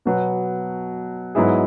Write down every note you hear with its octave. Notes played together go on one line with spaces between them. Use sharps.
B2 F#3 B3
G#2 F#3 B3 E4 G#4